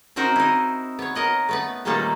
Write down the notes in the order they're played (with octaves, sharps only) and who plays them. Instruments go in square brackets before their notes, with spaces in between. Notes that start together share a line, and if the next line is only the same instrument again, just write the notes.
[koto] C4 D#4 F#4 A#4 C5
D#4 E4
B3 C#5
A#4 D#5 F#5
A3 B3 B4
A#2 D#3 G3 A3 A#3 A4